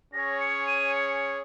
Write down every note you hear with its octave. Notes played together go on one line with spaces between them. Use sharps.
C#4 G#4 C#5 A#6
C#7
D#7
C#7